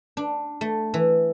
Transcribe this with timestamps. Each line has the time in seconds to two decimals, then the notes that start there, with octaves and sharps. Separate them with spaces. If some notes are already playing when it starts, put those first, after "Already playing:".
0.17 D4
0.61 A3
0.94 E3